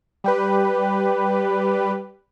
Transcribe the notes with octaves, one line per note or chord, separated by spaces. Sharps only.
G3 G4 B4